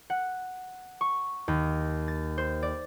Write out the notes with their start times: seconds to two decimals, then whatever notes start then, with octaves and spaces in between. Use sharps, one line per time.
0.10 F#5
1.01 C#6
1.48 D#2
2.08 A6
2.38 C5
2.63 D5